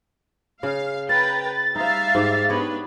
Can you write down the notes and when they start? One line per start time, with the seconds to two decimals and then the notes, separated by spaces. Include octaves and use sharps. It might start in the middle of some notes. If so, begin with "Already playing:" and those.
0.63 C#3 F5
1.09 B4 F5 G5 A#5 A6
1.43 B4
1.76 G3 D#4 C5 E5 F5
2.15 G#2 G4
2.49 B3 D4 G4 B4 C#5 D#5